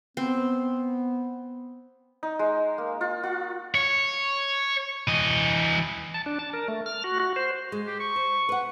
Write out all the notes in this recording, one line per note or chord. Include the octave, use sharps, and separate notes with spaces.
B3 C4
D#4
G#3
A#3
F4
F4
C#5
E3 D#5
A5
D4
A5
A#4
A3
F6
F#4
F#4
C5
G#3
G4
C#6
C5
B4 F#5